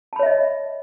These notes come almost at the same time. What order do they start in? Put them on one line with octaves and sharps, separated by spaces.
A5 B5 C#5 E5 D#5